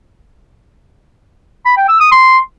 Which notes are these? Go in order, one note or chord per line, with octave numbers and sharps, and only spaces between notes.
B5
G5
E6
D#6
C6